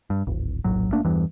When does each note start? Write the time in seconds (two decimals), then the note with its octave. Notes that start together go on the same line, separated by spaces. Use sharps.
0.10 G2
0.27 D1 G#1
0.64 F1 A#1 A2 F#3
0.92 G1 A3 A#3 D4
1.05 E2 G2 E3